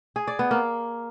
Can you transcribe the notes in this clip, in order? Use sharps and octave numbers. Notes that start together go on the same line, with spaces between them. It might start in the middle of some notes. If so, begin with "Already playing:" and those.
G#4
D5
B3
A#3